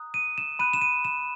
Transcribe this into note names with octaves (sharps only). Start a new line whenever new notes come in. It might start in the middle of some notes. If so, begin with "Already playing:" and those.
Already playing: A#5 D#6 F#6
D#7
E7
B5 F#6 D#7
E7
D#7
E7